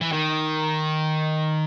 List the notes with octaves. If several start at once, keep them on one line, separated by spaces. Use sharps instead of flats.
E3
D#3